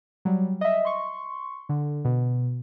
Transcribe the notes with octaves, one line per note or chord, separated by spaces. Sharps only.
F#3 G3
D#5 E5
C6 C#6
D3
B2